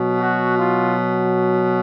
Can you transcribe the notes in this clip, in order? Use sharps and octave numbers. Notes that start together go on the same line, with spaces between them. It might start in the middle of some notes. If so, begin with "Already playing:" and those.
Already playing: B2 F#3
F#4
F4